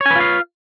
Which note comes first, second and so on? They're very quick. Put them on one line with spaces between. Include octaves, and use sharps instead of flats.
C#5 G#5 B4 F4 F5